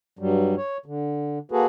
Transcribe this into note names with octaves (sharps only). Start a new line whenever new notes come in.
G2 F#3 G3
C#5
D3
A#3 F#4 G#4 A4 B4